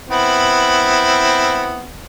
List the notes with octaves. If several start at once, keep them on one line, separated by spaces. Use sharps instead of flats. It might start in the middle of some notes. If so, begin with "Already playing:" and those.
B3 C4 E4